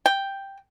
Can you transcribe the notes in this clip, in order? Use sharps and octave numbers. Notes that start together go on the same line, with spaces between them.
G5